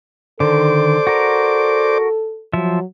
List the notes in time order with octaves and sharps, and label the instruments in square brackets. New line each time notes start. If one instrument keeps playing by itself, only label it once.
[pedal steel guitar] D3 D#3 [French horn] A4 [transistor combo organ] C5 D5 D6
[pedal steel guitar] F#4 A#4
[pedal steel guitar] F3 E5 [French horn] F#3